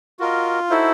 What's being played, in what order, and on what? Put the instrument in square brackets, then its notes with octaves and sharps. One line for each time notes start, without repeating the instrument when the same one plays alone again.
[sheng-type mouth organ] F4 [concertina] F#4 A#4 D#5
[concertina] D#4 F#4 A4 C5 [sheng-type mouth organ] E4